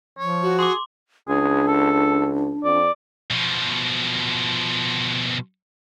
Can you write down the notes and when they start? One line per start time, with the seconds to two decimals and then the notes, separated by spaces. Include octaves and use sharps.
0.19 F3 C#5
0.43 F#4
0.59 G#4 C6 D6
1.29 C#2 D4 G#4
1.68 A4
2.64 F2 D5
3.31 B2 F3